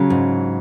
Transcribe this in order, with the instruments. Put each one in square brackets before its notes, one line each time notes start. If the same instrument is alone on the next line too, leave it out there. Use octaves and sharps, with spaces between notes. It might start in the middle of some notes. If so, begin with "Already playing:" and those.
Already playing: [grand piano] C#3 [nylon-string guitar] F#3
[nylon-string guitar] G#2